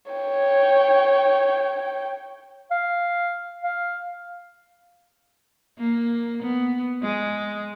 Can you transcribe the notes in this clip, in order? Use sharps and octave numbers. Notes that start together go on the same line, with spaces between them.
C#5 G5
F5
F5
A#3
B3
G#3